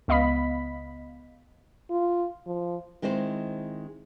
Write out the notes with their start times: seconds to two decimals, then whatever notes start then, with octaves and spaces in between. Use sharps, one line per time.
0.08 C#2 B3 D#5 F5 B5 B6
1.90 F4
2.47 F3
3.02 D#3 G#3 C4 E4 C5